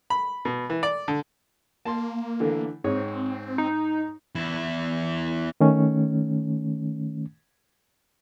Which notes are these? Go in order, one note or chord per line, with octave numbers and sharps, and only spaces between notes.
B5
B2
E3
D5
D3
A#3 A5 C6
D3 E3 A3
G#2 C4 G#4 C#5
D#4
E2 E4
D#3 A3 C#4